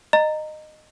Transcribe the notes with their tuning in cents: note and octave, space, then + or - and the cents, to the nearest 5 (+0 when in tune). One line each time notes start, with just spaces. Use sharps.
D#5 -15 A#5 -15